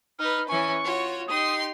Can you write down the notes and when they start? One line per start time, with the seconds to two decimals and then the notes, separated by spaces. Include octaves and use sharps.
0.19 D#4 B4 F6
0.48 E3 C#4 G#5 C#6
0.83 F4 F#4 C#5
1.28 D#4 G4 C6 D#6